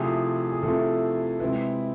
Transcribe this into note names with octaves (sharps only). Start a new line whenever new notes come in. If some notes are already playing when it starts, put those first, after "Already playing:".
Already playing: C3 F3 A3 C4 E4 G#4
G#4
C3 F3 A3 C4 E4 A4
C3 G#3 C4 E4 B4